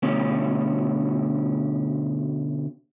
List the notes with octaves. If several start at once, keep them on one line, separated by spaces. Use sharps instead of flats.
D2 B2 C#4